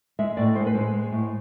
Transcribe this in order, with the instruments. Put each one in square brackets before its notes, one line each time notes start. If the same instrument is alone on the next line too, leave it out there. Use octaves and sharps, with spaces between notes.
[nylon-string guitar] G#3 E5
A2 D5
G#3 C5
B4
G#3 C5
G#3
A2